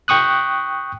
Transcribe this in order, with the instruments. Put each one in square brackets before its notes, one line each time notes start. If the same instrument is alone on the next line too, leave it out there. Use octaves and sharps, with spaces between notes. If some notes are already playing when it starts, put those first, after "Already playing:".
[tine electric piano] G5 C#6 D#6 F#6